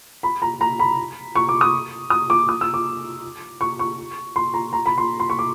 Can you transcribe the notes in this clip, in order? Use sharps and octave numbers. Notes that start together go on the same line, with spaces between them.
B5
A#5
A#5
B5
C#6
D6
D#6
D#6
D6
D#6
E6
D6
C#6
C#6
C6
A#5
A#5
B5
C6
C6
C#6
D6